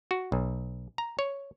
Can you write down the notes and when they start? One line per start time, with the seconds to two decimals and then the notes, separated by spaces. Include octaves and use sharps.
0.11 F#4
0.32 B1
0.98 A#5
1.19 C#5